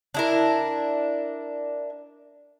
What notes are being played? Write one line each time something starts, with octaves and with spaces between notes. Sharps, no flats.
D4 E4 A#4